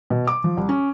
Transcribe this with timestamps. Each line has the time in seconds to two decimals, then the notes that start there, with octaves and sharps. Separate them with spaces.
0.10 B2
0.27 D6
0.44 F3
0.57 C2
0.69 C#4